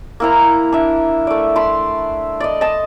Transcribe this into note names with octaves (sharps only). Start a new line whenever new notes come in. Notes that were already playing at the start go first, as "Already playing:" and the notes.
A#3 E4 A#5
D4 E5
A3 D5
A5 B5 C6
D5 D#5
D#5 A5